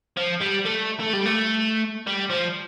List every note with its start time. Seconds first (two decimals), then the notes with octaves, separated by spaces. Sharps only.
0.17 F3
0.40 G3
0.65 A3
1.00 A3
1.13 G3
1.26 A3
2.07 G3
2.30 F3